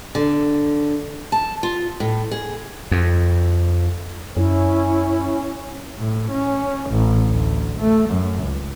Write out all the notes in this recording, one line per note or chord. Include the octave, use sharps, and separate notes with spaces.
D3
A5
F4
A2
G#4
F2
F#2 C#4 E4
A2
C#4
A1
D2
A3
F#2
C#2